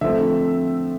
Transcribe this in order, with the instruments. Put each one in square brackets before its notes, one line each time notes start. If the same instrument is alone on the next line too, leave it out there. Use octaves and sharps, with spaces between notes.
[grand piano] D3 F3 A3 C4 E5